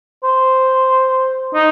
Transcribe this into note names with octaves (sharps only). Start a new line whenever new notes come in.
C5
D#4